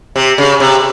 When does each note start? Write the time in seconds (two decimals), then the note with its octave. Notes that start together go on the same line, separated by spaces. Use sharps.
0.16 C3
0.38 C#3
0.60 C3